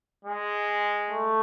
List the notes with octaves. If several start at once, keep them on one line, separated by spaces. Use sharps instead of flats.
G#3
A3